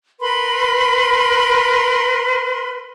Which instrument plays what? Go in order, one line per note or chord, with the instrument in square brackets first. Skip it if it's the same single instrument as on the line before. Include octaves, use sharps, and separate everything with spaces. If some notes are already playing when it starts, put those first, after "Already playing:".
[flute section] A#4 B4 B5 C6